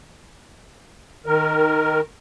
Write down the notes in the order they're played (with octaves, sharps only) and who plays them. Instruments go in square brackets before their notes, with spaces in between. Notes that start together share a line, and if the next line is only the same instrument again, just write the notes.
[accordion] D#3 A#4